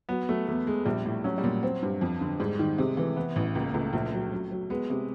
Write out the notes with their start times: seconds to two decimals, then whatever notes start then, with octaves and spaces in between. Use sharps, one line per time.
0.09 F#3 B3
0.28 F#3 A3
0.48 E2 A3
0.67 E2 G#3
0.85 A#1 G3
1.05 A2
1.24 F#3 C#4
1.38 G3
1.43 A#2 F#3
1.63 C4
1.82 G2
2.01 F2
2.21 D3
2.40 G#2 G3
2.59 D#3
2.78 C3 G#3
2.97 E3 A3
3.16 E3 B3
3.36 A1
3.55 C#2 A#3
3.74 C#2 A3
3.93 A#1
4.13 F#3
4.32 F#3
4.51 F#3
4.70 G#3 B3
4.90 C3 G#3